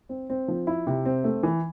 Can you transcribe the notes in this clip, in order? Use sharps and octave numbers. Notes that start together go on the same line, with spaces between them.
C4
C4
F3
E4
C3
C4
A3
E3